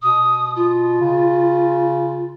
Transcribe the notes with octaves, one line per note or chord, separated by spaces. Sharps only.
B2 D#6
F4
C#3